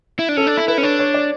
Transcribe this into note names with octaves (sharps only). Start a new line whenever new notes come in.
E4
D4
C#4 A4
D4
E4
E4 B4
C#4
D4 C#5
C#5
D5